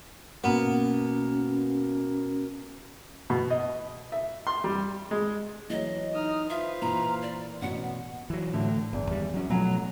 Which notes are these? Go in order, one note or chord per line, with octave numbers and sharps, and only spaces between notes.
B2 A#3 B3 C#4
B2
D#5
E5
C6
G3
G#3
E3 F#3 D#5
D#4 D#6 F6
F4 B4 C5 E5
A#2 E3 A#5
D5
A1 B2 B3 F#4 F#5
E3 F#3
A2 D3 A3
G1 E2
D#2 G3
F#3 C#4
B2 F3 F#3 A3 G#5